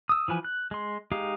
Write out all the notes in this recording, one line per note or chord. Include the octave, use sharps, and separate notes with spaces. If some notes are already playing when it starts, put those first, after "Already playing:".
D#6 E6
E3 F3 B4 G#5
F#6
G#3 C6
G#3 D#4 G4 F5